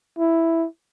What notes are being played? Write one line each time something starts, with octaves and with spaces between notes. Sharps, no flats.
E4